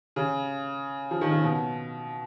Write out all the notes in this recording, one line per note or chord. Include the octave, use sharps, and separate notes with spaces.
C#3
F3
D#3
C#3
B2